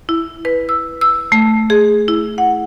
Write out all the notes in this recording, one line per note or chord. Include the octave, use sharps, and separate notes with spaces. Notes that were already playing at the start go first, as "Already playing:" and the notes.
E4
B4
E6
E6
A3
G#4
E4
F#5